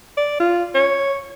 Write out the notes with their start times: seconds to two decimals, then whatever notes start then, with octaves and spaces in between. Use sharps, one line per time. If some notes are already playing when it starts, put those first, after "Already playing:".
0.17 D5
0.40 F4
0.74 C#5